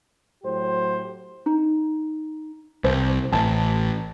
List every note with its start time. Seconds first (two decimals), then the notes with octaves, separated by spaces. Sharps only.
0.44 A2 F#3 G4 C5
1.46 D#4
2.84 C2 C5
3.33 A1 A5